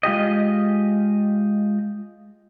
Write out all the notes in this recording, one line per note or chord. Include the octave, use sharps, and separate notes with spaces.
G#3 F4 G4 D#5